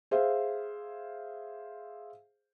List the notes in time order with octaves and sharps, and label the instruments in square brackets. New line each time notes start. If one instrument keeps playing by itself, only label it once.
[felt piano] G#4 C5 E5 F5